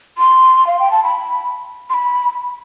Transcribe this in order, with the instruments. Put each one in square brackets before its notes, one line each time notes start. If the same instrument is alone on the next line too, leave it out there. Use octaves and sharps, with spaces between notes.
[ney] C6
F5
G5
A5
B5
C6
B5